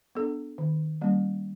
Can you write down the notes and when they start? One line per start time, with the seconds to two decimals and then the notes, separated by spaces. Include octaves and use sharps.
0.15 B3 D4 A4
0.58 D#3
1.01 G3 A#3 C#4